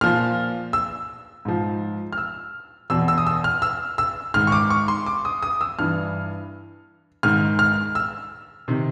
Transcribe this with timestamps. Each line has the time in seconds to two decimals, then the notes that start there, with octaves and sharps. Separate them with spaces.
0.01 A#2 F3 F6
0.73 E6
1.45 G#2 F3
2.12 F6
2.18 E6
2.90 E2 B2 E6
3.08 E6
3.18 D#6
3.27 E6
3.44 F6
3.62 E6
3.98 E6
4.34 G#2 D#3 F6
4.47 C#6
4.52 D6
4.70 C#6
4.88 C6
5.06 D6
5.25 D#6
5.43 D#6
5.61 E6
5.79 G2 E3 F6
7.23 G#2 D#3 F6
7.59 F6
7.95 E6
8.68 C3 D#3